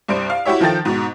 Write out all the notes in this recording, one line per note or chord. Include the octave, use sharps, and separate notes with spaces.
C2 G2 C5 D7
F5
E4 F#4 G4 C#5 E5
D#3 F3 A4 G5 A6
G#2 B2